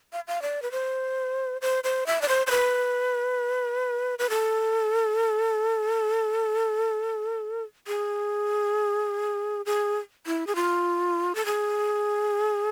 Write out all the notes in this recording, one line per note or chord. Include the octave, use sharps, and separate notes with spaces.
F5
F5
D5
B4
C5
C5
C5
E5
D5
C5
C5
B4
B4
A4
G#4
G#4
E4
G#4
F4
A4
G#4